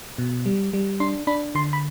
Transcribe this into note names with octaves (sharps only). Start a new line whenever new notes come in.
B2
G3
G3
D4 C6
D4 B5
D3 C6
B5